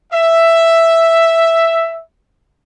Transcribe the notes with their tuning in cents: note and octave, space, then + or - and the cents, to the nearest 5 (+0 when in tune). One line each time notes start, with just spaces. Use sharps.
E5 +5